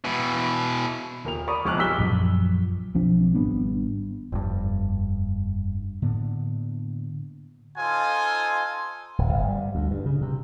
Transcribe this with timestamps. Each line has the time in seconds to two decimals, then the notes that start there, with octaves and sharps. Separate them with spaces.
0.04 B2 E3
1.25 D#1 A#4 F7
1.47 A#4 D5 A#5 B5 C#6 D#6
1.65 E1 F2 C#6 D6 F6 F#6
1.77 B1 A#2 G3 E6 B6 G7
1.98 A#1 F#2 F3
2.94 B1 F3 C4 D4
3.35 G#1 G3 B3 D4
4.32 F1 G2
6.02 A2 D3 A#3 B3
7.77 D#4 F4 A4 C5 G#5
9.18 D1
9.33 G1
9.48 G3
9.75 D2
9.91 G2
10.06 C#3
10.21 C3